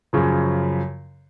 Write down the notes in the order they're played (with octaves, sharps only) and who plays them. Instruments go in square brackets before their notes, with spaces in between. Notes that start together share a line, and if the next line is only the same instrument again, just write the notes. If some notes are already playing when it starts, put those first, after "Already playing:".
[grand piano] F#2 C#3 F3